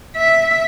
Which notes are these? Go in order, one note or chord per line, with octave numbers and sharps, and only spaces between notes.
E5